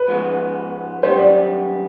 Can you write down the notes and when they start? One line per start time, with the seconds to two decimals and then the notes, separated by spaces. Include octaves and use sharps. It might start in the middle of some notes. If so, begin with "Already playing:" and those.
Already playing: B4
0.08 G#2 F3 G#3 B3
1.03 F#2 D#3 G3 B3 C5
1.19 D5